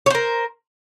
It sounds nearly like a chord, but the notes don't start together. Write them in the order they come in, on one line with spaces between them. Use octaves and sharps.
C#5 C5 A#4